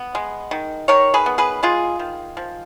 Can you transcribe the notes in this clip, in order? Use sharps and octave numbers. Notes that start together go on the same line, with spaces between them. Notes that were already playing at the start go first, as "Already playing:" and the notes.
Already playing: B3
G#3
D#3
D#3 A#4 C#5
G#4 B4
B3
G#4 B4
G#3 F4 G#4
D#3
F3